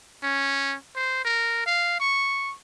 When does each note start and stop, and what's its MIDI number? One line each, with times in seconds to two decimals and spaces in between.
0.23 0.76 61
0.96 1.20 72
1.25 1.61 70
1.66 1.97 77
2.00 2.54 85